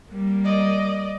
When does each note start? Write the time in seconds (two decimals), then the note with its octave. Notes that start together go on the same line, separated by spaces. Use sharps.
0.12 G3 A#3
0.44 D5 D#5